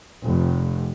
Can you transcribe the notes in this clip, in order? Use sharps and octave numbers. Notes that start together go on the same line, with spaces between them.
F1